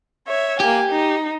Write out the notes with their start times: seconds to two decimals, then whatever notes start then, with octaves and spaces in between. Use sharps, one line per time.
0.27 C#5 E5
0.60 A#3 G4 G#5
0.91 D#4